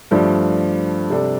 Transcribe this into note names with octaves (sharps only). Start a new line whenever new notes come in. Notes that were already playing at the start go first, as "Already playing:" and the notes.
G2 F3 A3 D4
C3 G3 D4 A4